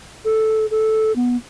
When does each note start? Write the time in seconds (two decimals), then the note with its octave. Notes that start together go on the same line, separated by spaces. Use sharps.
0.25 A4
0.71 A4
1.16 B3